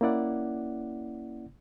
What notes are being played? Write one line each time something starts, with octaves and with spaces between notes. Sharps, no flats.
A#3 C#4 E4 D5 F#5